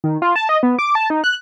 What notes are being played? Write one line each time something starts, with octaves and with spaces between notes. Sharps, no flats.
D#3
F4
A5
D#5
B3
D6
A5
D#4
F#6